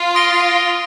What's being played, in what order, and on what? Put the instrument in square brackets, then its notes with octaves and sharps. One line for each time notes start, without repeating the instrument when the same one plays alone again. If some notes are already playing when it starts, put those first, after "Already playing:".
Already playing: [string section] F4
[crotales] D#6 A#6 D7 G7